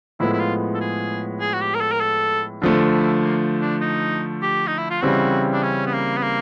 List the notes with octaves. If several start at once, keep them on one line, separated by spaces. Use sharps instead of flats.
A2 F3 G#3 B3 E4
E4
F4
A4
G#4
G#4
F#4
G4
A#4
A4
A#4
A4
D3 F3 A3
E4
A#3
D4
D#4
G4
D#4
E4
F4
C#3 E3 G3 C4 E4 F#4
D4
C#4
B3
A#3
B3
A#3